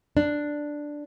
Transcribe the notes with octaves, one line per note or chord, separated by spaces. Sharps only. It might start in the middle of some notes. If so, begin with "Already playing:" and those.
D4